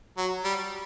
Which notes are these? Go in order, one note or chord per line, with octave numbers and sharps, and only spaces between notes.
F#3
G3